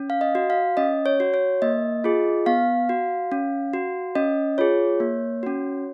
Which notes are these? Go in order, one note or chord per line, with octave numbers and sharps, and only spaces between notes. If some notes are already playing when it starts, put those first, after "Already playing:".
Already playing: C#4
F5
D#5
F#4
F5
C#4 D#5
C#5
F#4
C#5
A#3 D#5
F4 G#4
B3 F5
F#4
C#4
F#4
C#4 D#5
F4 G#4 C#5
A#3
C#4 F#4